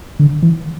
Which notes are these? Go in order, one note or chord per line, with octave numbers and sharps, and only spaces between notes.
D3
E3